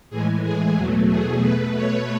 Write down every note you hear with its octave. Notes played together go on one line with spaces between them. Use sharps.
A2 E3 G#3 G#4
G#4
E2 B2 F#3 A3
G#4
B2 A3 B4
C#5